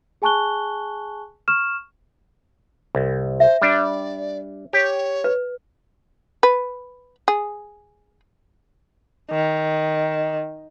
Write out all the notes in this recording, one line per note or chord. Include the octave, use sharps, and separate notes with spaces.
G#4 G#5 A5 C#6 F#6 G7
C#6 F6 E7
C2
C5 E5
G3 D4 D5
G4 C#5
B4
B4
G#4
D#3